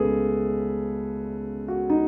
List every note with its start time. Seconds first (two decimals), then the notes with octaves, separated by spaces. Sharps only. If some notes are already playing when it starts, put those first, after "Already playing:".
Already playing: C#2 B2 A3 C#4 G#4 A4 B4
1.68 F#4
1.90 D#4